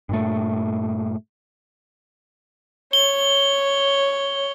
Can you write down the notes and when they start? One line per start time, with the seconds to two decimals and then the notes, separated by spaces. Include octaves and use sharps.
0.09 G2 A#2 A3
2.93 C#5 G7